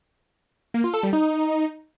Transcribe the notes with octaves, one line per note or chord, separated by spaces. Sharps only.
A#3
F4
A4
G3
D#4